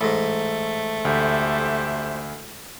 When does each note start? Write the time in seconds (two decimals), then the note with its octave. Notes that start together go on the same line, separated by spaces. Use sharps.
0.01 A1 G#2 A3
1.05 D2 G4 C5 E5